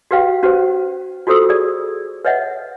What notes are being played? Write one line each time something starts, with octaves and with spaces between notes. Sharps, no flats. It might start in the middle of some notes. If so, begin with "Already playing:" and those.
F#4 G4 B4 F5 G5
C#4 F#4 G4 B4 C5
F4 F#4 A4 C5 D#6 E6
G#4 D5
B4 C#5 D#5 E5 F#5